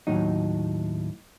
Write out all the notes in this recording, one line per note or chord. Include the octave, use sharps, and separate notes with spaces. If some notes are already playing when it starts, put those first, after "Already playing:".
D#2 A2 F#3 D#4